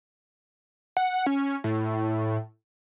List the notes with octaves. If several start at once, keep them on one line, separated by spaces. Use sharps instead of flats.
F#5
C#4
A2